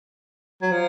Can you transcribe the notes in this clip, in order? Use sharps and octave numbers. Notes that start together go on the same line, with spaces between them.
F#3
F3